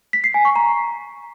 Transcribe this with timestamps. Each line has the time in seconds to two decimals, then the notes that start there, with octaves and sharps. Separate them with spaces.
0.13 B6
0.24 C7
0.34 G#5
0.45 C#6
0.56 A#5